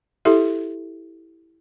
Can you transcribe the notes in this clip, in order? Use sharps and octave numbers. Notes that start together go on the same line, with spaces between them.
E4 G4 A4 E5